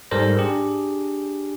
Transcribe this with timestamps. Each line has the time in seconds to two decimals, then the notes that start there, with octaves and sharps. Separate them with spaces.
0.11 G#2 G3 A4 A#4 C5 A#6
0.37 D4 G4 G#4